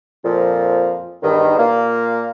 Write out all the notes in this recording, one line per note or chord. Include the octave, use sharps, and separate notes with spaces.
F2 A#2 F3
E2 G2 D#3
A#2 A#3